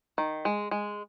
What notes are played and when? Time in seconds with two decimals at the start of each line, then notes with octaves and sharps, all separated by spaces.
0.18 D#3
0.45 G#3
0.71 G#3